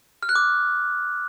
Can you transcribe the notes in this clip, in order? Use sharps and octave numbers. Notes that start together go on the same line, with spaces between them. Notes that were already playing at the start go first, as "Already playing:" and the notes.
F6
F#6
D6